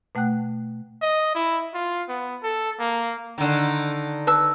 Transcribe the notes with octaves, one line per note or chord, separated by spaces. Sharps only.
B2 A3 F#5 G5 F#6
D#5
E4
F4
B3
A4
A#3
D3 D#3
B4 A5 E6